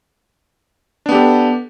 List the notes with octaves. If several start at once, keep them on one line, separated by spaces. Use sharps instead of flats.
B3 D4 G4 A4